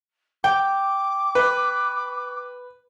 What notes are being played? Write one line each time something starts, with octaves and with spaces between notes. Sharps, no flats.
G5 D6
B4